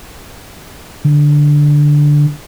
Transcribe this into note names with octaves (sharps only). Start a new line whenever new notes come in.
D3